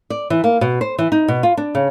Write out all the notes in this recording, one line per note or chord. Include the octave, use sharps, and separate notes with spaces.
D5
E3
A#3
B2
C5
E3
D#4
B2
F4
D4
C#3